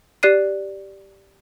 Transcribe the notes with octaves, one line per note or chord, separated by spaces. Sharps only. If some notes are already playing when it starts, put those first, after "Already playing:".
G4 D5 F#6 C7 D#7